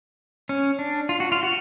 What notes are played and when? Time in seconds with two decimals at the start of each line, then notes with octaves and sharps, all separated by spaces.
0.49 C#4
0.79 D4
1.09 F4
1.20 F#4
1.32 F4
1.43 F#4